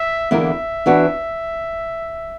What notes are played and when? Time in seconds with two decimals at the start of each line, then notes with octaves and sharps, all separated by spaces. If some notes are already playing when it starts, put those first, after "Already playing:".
Already playing: E5
0.31 E2 D3 A#3 E4 A#4 E5
0.86 E3 B3 D4 F#4 B4